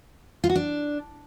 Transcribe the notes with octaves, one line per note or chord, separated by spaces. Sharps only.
F4
F#4
D4